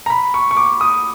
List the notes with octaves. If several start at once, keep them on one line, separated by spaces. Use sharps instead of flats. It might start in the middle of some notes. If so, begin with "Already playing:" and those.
A#5
B5
C#6
C#6
D6
D#6